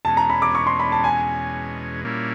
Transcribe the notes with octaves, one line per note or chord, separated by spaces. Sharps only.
E2 B2 G#3 C#4 A5
A#5
B5
D6
C#6
C6
B5
A5
G#5
A#2 G3 A#3 C#4 E4